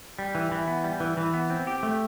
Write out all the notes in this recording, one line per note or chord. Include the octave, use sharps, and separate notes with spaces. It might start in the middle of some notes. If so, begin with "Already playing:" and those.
G3
E3
E3
B3
G3
E3
E3
B3
C4
G4
A3